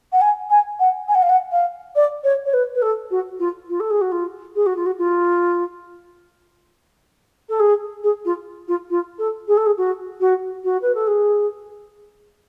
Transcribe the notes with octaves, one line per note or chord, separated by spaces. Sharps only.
F#5
G#5
G#5
F#5
G#5
F#5
F5
F#5
F5
D5
C#5
C#5
B4
B4
A4
F#4
F4
F4
A4
G#4
F#4
F4
G#4
F#4
F4
F#4
F4
A4
G#4
G#4
F4
F4
F4
A4
G#4
A4
G#4
F#4
F#4
F#4
B4
A4
G#4